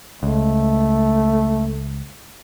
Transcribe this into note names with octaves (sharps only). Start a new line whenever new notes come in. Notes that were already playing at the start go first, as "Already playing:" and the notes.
C#2 A3